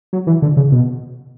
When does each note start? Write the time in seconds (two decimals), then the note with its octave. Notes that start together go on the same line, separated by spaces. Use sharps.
0.13 F#3
0.27 E3
0.42 D3
0.57 C#3
0.72 B2